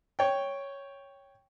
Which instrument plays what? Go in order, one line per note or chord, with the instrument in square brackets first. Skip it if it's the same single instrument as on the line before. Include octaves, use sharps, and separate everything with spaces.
[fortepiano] C#5 G5